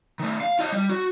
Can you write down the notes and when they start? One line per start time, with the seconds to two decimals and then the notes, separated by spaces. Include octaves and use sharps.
0.20 D#3 A3
0.41 F5
0.59 F4 D#5
0.72 G3
0.89 F#4